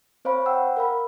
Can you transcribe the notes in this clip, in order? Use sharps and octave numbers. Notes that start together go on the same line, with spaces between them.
C4 C5 C#5 F5 B5
F#5 G5 E6
A#4 F5 B5